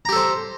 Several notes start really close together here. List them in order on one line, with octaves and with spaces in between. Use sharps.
A#5 G4 A4 C5